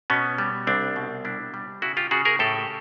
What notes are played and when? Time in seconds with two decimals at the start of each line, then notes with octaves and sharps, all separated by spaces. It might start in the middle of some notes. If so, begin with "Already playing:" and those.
0.10 B2 B3 C#4
0.38 G3
0.67 C2 C4 D4
0.96 B2
1.25 G3 D4 E4
1.54 G3
1.82 C#3 E4 F#4
1.97 F4 G4
2.11 C#3 F#4 G#4
2.25 G#4 A#4
2.39 A2 G4 A4